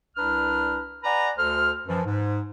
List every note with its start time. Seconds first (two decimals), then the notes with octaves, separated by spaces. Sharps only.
0.16 C2 D4 B4 A#5 F6
1.04 B4 D5 F#5 G#5 A#5
1.37 D2 A4 C5 F6
1.87 F#2 E3 F3
2.05 G#2